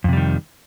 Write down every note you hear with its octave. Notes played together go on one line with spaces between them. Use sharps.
F2 C3 D#3 G3